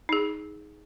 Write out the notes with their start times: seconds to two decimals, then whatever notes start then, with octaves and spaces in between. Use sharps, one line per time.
0.09 D#4 G#4